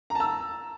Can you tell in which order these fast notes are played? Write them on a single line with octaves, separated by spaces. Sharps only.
A#5 A5 E6